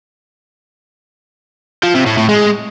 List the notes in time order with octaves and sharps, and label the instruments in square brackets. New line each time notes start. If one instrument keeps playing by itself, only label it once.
[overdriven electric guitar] F3
C3
A2
A2
G#3